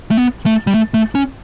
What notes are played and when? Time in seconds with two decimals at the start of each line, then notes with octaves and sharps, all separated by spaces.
0.11 A3
0.17 B3
0.46 A3
0.67 G3
0.74 A3
0.94 A3
1.15 C#4